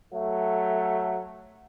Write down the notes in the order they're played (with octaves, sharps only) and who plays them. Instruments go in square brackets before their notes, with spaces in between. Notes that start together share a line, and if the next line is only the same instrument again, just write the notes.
[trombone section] F#3 A3